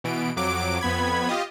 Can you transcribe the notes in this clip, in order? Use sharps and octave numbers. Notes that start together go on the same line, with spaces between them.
B2 E3 D7
F2 F#3 D6 D7
F2 B3 B5 G#6
F4 G4 D#5